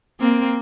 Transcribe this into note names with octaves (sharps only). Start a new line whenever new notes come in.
A#3 C4